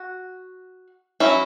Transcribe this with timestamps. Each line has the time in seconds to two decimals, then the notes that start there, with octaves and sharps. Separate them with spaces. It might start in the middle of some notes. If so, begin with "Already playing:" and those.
Already playing: F#4
1.20 F#3 C#4 E4